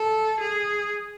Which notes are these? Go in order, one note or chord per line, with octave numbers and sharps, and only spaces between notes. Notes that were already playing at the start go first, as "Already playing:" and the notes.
Already playing: A4
G#4